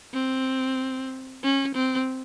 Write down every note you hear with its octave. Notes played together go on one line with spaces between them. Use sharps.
C4
C#4
C4